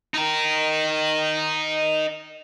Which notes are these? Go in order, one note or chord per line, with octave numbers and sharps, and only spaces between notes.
D#4 A#4